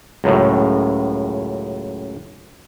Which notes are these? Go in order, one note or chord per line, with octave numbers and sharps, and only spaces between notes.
C#2 F#2 A2